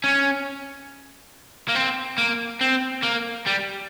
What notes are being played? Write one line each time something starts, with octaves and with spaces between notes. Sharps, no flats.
C#4
A#3
C4
A#3
C4
A#3
G3